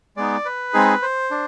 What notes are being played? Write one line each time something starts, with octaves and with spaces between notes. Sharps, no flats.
G#3 B3 D#4 D5
B4
G#3 C4 D#4 G#4
C5
D4